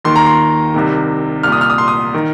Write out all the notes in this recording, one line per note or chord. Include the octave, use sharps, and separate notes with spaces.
D#2 D#3 C6
A#5
C6
C2 C3 D#3
C2 A#2 F6
D#6
F6
D#6
C6
D#6
D#3